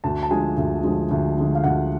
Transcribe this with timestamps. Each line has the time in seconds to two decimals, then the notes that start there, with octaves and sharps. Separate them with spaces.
0.04 D2 A5
0.23 A5
0.30 D3 F3 G#3 G#5
0.57 D2
0.83 D3 F3 G#3
1.11 D2
1.37 D3 F3 G#3
1.55 F5
1.64 D2 F#5